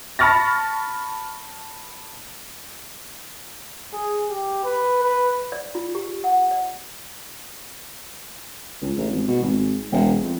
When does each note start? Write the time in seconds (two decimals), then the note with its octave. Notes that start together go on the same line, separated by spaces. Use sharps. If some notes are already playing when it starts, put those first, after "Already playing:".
0.19 A5 B5 C#6 F6 A6 A#6
3.93 G#4
4.30 G4
4.64 B4
5.03 B4
5.52 D5
5.75 F4
5.95 G4
6.24 F#5
6.51 D5
8.82 C#2
8.98 A1
9.11 G#1
9.28 B2
9.42 G#1
9.92 E1
10.23 F2